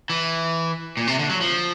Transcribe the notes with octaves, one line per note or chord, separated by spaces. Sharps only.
E3
A#2
C3
D3
F#3
F3